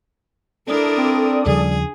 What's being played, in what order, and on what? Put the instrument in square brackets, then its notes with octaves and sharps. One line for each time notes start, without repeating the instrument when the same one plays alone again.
[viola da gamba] D4 E4 A#4 [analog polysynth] A4 D5 D#6
[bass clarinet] C4
[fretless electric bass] D#2 C#3 F3 [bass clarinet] G3 [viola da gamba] G#4